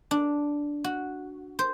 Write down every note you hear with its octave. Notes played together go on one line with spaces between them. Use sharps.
D4
F#4
C5